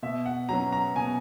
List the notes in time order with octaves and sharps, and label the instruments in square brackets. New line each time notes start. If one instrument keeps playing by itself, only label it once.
[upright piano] B2 E5
F#5
F#3 C#4 A#5
A#5
B2 G#5